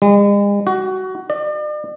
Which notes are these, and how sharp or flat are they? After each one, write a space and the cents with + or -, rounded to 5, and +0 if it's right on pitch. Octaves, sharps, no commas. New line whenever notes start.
G#3 -40
F#4 +20
D5 +40